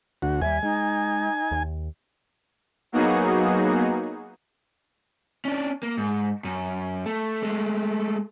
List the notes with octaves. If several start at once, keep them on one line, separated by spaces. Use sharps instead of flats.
D2 F#4
D#2 G3 E5 G#5
G#3 D#4
D#2
F#3 A#3 B3 D#4 F#4 G#4
C#4 D4
A#3
G#2
F#2
A3
G#3 A3